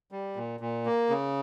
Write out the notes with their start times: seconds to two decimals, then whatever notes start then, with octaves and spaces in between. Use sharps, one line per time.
0.11 G3
0.36 A#2
0.60 A#2
0.86 A#3
1.09 C#3